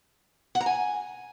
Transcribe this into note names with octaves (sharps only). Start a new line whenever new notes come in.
F#5
A#5
G#5